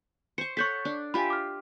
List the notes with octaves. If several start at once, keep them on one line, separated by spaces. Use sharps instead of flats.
C5 C#6 C#7
A4 C#5 F#5 C#6 G6 B6
D4
F4 G4 E5 G#5 B5
D6 F6